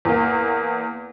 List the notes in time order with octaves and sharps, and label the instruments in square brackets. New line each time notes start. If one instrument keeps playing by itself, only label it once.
[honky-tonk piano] E2 A#3